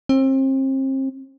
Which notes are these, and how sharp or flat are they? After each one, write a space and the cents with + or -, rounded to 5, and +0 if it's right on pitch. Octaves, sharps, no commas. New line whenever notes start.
C4 +35